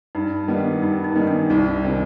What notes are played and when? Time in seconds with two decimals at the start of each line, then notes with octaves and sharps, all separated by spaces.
0.15 G2 D#4
0.48 D#3 G3 B3
0.82 G2 D#4
1.04 D#4
1.15 D#3 G3 B3
1.27 D4
1.50 C2 D#4
1.83 C3 D#3 D4